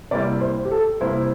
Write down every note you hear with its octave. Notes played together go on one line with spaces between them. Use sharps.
C3 G3 A#3 E4 D5
C5
G4
A4
C3 G3 A#3 E4 C5